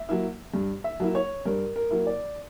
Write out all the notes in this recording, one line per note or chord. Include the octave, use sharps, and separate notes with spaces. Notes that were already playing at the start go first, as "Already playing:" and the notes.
Already playing: E5
F#3 A#3 E4
G2
E5
F#3 A#3 E4
C#5
G2 A#4
A#4
F#3 A#3 E4
D5